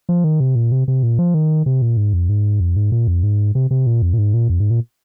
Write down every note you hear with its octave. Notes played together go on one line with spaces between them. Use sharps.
F3
D#3
C3
A#2
C3
C3
A#2
F3
D#3
C3
A#2
G#2
F2
G#2
F2
G#2
A#2
F2
G#2
C3
C3
A#2
F2
A#2
G#2
A#2
F2
G#2
A#2